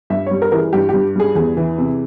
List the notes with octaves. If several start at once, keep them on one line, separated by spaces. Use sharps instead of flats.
G2 E5
G3 C#5
A#4
E3 A#4
G#4
G2 G4
G2 G4
G3 G#4
E2 G#4
E3
C3